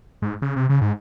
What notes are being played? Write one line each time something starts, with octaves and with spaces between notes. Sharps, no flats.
G#2
C#3
C3
C#3
G#2